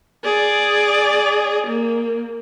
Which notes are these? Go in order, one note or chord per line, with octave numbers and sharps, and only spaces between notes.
G#4 D5
A#3